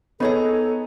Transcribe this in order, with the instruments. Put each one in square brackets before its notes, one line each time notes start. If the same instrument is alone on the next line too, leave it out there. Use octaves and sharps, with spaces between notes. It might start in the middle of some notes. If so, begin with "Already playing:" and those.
[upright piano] B3 C#5 D#5 [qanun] D#4 G#4 A#5 [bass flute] A4